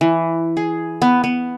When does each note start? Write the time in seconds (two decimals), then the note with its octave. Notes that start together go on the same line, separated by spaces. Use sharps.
0.01 E3
0.57 G#4
1.02 B3
1.24 B3